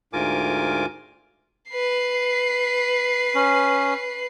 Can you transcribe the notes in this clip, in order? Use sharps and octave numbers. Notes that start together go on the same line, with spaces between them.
D2 G#2 F4 A#4 G#5 D6
B4 C7
C#4